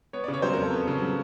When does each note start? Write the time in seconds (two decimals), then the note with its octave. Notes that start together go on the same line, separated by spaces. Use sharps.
0.13 B3 C#5
0.24 D5
0.28 C#3
0.34 C#5
0.42 F#3 C5
0.53 F2 A#4
0.63 A4
0.73 B3
0.87 C#3
1.02 F#3